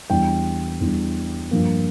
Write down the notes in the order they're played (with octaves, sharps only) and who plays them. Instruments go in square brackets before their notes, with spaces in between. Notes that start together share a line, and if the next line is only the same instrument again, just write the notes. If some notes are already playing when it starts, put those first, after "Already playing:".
[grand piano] E2 E3 G3 D4 G5
E2 E3 G3 D4
G2 F3 A#3